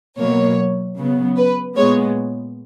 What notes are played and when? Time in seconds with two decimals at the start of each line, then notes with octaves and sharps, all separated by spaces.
0.18 B2 F#3 A#3 C#5
0.97 C#3 F#3 B3
1.36 B4
1.76 A#2 G#3 B3 C#5